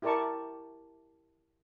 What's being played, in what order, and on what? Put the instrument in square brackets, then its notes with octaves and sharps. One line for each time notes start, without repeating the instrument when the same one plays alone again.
[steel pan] E4 G4 A#4 D5 A5 C#6